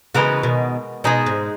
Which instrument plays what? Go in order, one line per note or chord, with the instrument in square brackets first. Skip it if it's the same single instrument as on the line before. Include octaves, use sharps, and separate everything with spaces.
[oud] C#3 E3 [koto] G#3 B3 F#4 A#4
[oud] B2 D#3
[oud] B2 [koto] G#3 D#4 G#4
[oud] G#2